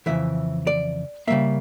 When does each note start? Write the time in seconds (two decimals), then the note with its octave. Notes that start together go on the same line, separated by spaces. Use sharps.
0.06 F2 C#3 E3 E5
0.67 D5
1.27 C#3 G3 A#3 E5